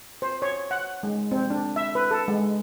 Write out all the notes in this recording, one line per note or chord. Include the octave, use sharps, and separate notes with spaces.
C5
C#5
F#5
G#3
C4
D4
E5
B4
A4
G#3